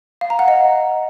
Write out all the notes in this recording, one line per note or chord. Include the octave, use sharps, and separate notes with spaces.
F5
A#5
F#5
D#5